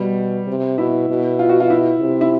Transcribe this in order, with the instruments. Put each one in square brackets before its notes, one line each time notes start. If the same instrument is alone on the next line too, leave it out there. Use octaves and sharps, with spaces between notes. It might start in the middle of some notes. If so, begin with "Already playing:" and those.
Already playing: [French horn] B2 [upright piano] G3
[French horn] C3
[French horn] B2 [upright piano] E4
[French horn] B2
[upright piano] F4
F#4
F4
E4
[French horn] C3
[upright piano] E4